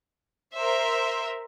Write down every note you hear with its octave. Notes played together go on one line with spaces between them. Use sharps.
A#4 C5 E5